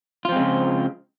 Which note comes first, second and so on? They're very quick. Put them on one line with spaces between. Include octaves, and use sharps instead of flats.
F4 F3 C4 G#3 C#3